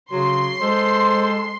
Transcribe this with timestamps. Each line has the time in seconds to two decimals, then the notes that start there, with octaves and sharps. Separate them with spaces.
0.11 C#3 F#3 C6
0.61 G#3 A4 C5